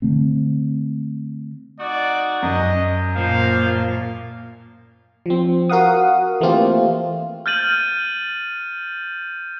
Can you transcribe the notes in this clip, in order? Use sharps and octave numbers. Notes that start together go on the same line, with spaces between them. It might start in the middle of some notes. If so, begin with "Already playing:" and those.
D3 A3 C4
D#4 F#4 D5
F#2 D#5
A#2 F3 F5
F3 C4
F#4 A#4 F5 F#5 D#6
E3 A3 A#3 C4 F4 G4
F6 G6 A6 D#7 F#7